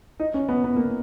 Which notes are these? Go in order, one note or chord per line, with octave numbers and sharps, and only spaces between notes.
D#4
C#4
B3
B3
A#3